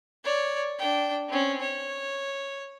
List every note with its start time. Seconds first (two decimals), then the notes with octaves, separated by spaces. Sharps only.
0.24 C#5 D5
0.79 D4 G5
1.28 C4 C#4
1.61 C#5